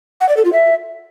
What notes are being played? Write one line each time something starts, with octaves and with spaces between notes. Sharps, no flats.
F#5
D5
A4
F4
E5